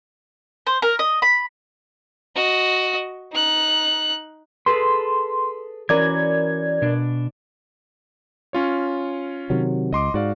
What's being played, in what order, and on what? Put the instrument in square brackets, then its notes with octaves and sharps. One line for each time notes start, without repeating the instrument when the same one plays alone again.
[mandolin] C5
A#4
D#5
B5
[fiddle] F#4 D#5
D#4 F#6
[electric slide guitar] G#4 A4 B4 [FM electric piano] C6
[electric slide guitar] E3 C#4 F#4 [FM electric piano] A#4 D5 G#6
[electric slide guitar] B2 D4
[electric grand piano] C#4 F4 C#5
[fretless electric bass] C3 D#3 F#3
[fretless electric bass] C#2 [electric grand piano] D#5 C6 D6
[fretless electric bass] G#2 [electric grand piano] F#4 D5 F5